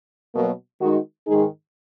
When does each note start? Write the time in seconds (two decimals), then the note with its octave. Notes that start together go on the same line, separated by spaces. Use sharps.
0.33 B2 F#3 A#3
0.79 D#3 G#3 D#4 F#4
1.26 G#2 D#3 G#3 D#4 G#4